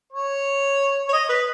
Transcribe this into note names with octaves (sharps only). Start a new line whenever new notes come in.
C#5
C#5
D#5
B4